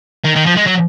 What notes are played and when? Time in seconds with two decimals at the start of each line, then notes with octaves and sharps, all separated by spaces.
0.25 D#3
0.36 D#3
0.46 F3
0.57 G#3
0.67 F#3